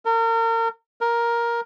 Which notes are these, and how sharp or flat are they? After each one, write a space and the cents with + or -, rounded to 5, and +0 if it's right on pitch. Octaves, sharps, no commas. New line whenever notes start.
A#4 -35
A#4 +10